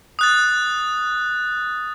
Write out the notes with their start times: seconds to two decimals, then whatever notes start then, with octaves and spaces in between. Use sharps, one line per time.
0.19 D#6 F#6 A6